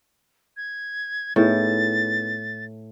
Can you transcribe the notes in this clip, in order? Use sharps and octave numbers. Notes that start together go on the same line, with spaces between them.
G#6
A2 B3 D#4 G#4 A6